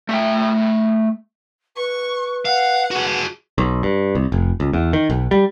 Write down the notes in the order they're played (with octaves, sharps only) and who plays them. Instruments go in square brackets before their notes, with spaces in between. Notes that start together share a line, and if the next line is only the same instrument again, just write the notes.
[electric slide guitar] A3 E5 G5
[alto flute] B4 [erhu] C#6
[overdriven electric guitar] F5 [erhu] F#5
[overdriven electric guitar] F#4 G#4
[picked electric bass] B1
G2
C2
F1
C#2
E2
D#3
B1
G3